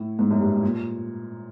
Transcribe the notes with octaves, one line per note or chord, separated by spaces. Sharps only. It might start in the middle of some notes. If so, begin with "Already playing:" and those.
Already playing: A2
G#2
F#2
G2
A2
A#2